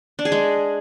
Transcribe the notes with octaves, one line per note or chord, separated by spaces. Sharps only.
D4
G#4
G#3